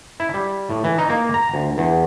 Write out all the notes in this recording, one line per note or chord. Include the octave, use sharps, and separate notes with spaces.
E4
G3
A2
E3
D#4
A#3
A#5
D2
E2